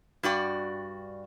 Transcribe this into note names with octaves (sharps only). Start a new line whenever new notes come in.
G2 F#4 D5 G5